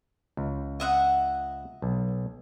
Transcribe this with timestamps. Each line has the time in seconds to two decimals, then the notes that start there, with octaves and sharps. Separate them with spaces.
0.37 C#2
0.80 D#5 E5 F#5
1.82 B1